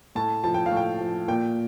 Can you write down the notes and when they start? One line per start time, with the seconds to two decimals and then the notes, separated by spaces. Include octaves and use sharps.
0.15 A2 A5
0.44 F3 A5
0.54 G5
0.66 F5
0.71 A2
0.77 G5
1.00 F3
1.28 A#2 G5